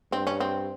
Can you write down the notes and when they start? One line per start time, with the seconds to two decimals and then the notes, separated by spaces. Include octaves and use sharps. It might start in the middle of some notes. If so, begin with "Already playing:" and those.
0.12 G2 C4
0.27 C#4
0.40 C4